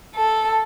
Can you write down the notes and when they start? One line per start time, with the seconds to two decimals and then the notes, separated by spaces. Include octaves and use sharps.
0.14 A4